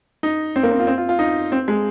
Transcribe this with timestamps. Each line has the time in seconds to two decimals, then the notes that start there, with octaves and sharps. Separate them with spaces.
0.23 D#4
0.56 C4
0.63 A#3
0.71 C4
0.80 F4
0.87 C4
0.98 F4
1.09 F4
1.19 D#4
1.52 C4
1.68 G#3